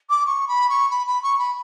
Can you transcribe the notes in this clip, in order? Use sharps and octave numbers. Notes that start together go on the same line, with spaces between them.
D6
C#6
B5
C#6
B5
B5
C#6
B5